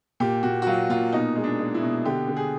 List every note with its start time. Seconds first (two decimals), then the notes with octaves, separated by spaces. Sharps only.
0.20 A#2 G4
0.43 A#2 F#4
0.62 F#4
0.67 F#3 F4
0.89 A#2 F4
1.12 B2 D#4
1.36 G#3
1.44 D4
1.59 G#3
1.74 E4
1.82 B2
2.05 D3 G4
2.28 D3
2.36 G#4